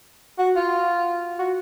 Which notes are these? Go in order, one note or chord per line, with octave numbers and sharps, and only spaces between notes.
F#4
F4
F#4